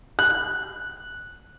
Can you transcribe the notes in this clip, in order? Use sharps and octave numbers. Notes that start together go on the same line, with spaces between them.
F#6